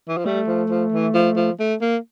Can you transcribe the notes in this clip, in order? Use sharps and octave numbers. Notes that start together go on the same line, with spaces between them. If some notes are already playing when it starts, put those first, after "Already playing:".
E3
F3
G3 A3
F3
F3
E3
F3
F3
A3
A#3